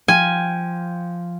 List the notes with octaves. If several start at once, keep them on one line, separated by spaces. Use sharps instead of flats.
F3 G5 G#5 F6